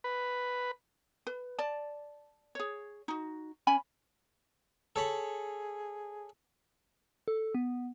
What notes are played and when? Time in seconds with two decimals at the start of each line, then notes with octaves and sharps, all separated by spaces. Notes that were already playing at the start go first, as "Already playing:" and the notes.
0.04 B4
1.27 B4
1.58 D5 A5
2.55 G#4 C#5
3.08 D#4 F#4
3.67 C#4 G#5 B5
4.96 G#4 A4 C#5 B5
7.28 A4
7.55 B3